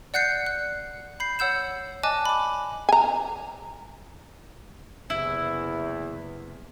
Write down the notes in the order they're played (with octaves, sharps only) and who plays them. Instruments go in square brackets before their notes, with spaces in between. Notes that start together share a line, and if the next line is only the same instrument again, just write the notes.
[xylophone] D5 F#5 F#6 G6 C7 C#7
F#6
B5 G6 C7
C#5 F#5 E6 G6 E7
D5 D#5 G#5 A5 D6 F#6
B5 D6
[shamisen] G#5 A#5
[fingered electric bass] F#1 C3 [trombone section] E2 [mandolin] E4